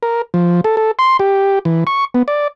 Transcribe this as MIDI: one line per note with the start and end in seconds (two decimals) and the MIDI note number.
0.03 0.22 70
0.34 0.61 53
0.64 0.77 69
0.77 0.91 69
0.99 1.17 84
1.19 1.59 67
1.65 1.84 52
1.87 2.05 85
2.14 2.23 59
2.28 2.48 74